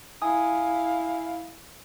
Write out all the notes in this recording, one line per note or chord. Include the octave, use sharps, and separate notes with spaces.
E4 F5 G#5 D#6